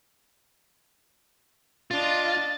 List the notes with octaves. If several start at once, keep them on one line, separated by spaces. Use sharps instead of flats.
D4 F4 D#5 A6